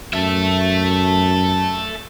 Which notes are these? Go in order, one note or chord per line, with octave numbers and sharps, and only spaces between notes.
F#2 A4 E5